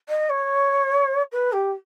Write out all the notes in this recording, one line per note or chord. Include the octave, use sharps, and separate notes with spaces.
D#5
C#5
B4
G4